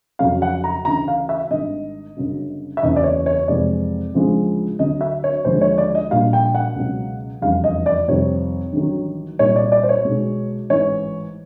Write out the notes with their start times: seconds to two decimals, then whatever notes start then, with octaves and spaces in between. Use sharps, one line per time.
0.19 F2 C#3 F#3 F5
0.42 F#5
0.64 A#5
0.85 D2 C#3 E3 A#5
1.08 F5
1.29 E5
1.51 G#1 G2 D#3 D#5
2.17 G1 F#2 C#3
2.77 E5
2.82 F#1 E2 C#3 E3 D#5
2.96 D5
3.04 C#5
3.26 C#5
3.48 F2 C3 E3 G#3 D5
4.14 D2 C#3 F3 G#3
4.79 D2 D3 F#3 D#5
5.01 E5
5.24 C#5
5.45 D#2 D3 F3 G#3 C5
5.61 C#5
5.78 D5
5.95 D#5
6.11 A#1 A#2 G3 F5
6.33 G5
6.55 F#5
6.76 C#2 B2 F#3
7.42 F1 E2 C#3 E3 G3 F5
7.64 D#5
7.86 D5
8.08 F2 C3 D#3 G3 C#5
8.73 A1 G2 D#3 F#3
9.39 C2 A#2 G3 C#5
9.56 D5
9.72 D5
9.83 C5
9.89 C#5
10.05 B1 B2 G#3
10.70 A1 G#2 E3 C#5